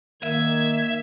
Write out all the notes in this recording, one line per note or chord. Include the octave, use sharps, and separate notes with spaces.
D#3 A#3 E5 G#6